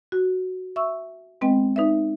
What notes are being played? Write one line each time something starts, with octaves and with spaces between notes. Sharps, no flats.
F#4
E5 C#6 E6
G#3 B3 C4 B4 D#5 G5
D#4 B4 D5 E5